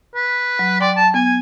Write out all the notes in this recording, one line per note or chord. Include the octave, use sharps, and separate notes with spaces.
B4
F#3
D5 G5 B5 C6
A5
B3 G#5